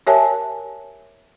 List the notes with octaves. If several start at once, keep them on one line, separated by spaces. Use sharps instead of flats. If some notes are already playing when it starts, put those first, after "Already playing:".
G4 A#4 C#5 E5 G#5 A5